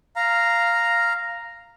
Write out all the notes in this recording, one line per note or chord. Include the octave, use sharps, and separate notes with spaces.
F5 A#5